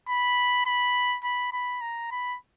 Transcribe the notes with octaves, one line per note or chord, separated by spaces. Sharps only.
B5
B5
B5
B5
A#5
B5